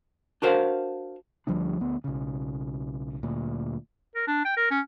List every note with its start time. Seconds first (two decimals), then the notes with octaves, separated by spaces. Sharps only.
0.42 D4 F#4 A#4 C5 F5 F#5
1.47 D2 F3 G3 D4
1.81 D2 B3
2.04 B1 C#3
3.23 D2 A#2
4.15 A#4
4.27 D4
4.45 G5
4.57 A#4
4.71 C#4